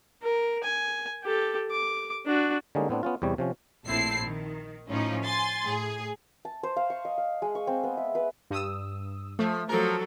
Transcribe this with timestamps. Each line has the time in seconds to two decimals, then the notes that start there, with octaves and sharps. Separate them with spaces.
0.23 A#4
0.64 G#5
1.25 G4 A4
1.71 D6
2.26 D4 F#4
2.75 D3 G3 G#3 A#3 C#4 D#4
2.89 A2 B3 C4 D4
3.03 B3 C#4 F4
3.22 E2 C3 G3 C#5
3.38 C3 F3 C#4
3.87 A#1 A2 C4 E4 A5 C7
4.27 D#3
4.89 A2 F3 C#4 D#4
5.23 G#5 C6 A6
5.65 A2 G#4
6.45 A5
6.63 C5
6.76 F5
6.90 C#6
7.05 D#5
7.18 F5
7.42 G#3
7.55 C#6
7.67 C4
7.84 B3
7.97 E5
8.15 B4
8.51 G2 D#6 E6
9.39 F3 A3
9.69 F3 F#3 A4 A#4